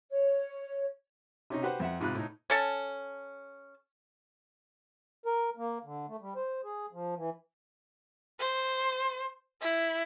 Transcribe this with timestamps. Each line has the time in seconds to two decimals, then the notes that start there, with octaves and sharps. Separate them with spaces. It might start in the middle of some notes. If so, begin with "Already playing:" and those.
0.10 C#5
1.50 C3 C#4 D#4
1.62 F#4 G4 B4 C5 F#5
1.80 F2 E5 F#5
2.00 G#2 C3 F4 B5 F#6
2.15 A2 D#4
2.50 C#4 A4 A5
5.26 A#4
5.57 A#3
5.84 D3
6.07 A3
6.21 G3
6.36 C5
6.64 G#4
6.92 F3
7.17 E3
8.40 C5
9.61 E4